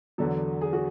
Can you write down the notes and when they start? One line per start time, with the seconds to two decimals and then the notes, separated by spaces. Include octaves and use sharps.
0.18 E2 D3 F#3 A4
0.61 G#4
0.73 F#4